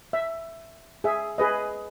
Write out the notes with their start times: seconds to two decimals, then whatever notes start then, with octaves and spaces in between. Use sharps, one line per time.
0.13 E5
1.04 G#4 E5
1.38 G#4 B4 D#5